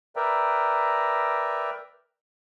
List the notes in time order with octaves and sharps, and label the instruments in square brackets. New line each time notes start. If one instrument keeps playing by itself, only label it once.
[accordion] A#4 B4 D5 E5 G5 A#5